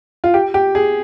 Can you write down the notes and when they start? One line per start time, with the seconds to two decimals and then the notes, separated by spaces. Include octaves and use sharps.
0.24 F4
0.34 G4
0.54 G4
0.75 G#4